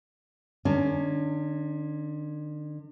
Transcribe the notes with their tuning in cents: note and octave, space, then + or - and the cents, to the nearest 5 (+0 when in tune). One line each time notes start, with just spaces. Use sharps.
D3 +45 C#4 +20